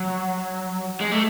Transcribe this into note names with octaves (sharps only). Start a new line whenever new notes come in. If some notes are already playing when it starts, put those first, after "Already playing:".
Already playing: F#3
G#3
A3